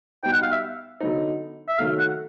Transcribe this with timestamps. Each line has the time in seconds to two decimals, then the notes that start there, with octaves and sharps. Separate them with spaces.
0.23 B2 G3 B3 D#4 G5
0.32 F#5
0.42 F5
0.52 E5
1.00 D3 F#3 B3 D#4
1.68 E5
1.78 D#3 F#3 A3 F5
1.99 F#5